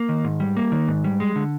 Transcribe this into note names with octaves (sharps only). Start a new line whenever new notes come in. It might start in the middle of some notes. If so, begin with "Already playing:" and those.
Already playing: A#3
D#3
G#2
G3
A#3
D#3
G#2
G3
G#3
D3